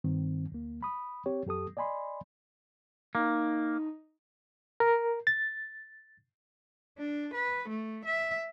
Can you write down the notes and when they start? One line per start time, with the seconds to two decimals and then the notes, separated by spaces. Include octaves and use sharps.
0.04 G2 D#3 C4
0.52 D2 A#3
0.83 B5 D#6
1.26 C4 G4 C#5
1.46 F#2 G4 A4 D#6
1.77 D5 D#5 G#5 B5 C6
3.15 A#3 D#4
4.80 A#4
5.27 A6
6.98 D4
7.34 B4
7.68 A3
8.05 E5